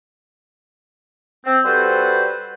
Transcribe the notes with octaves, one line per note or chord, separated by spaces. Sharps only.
C4
G3 F#4 A4 B4 C5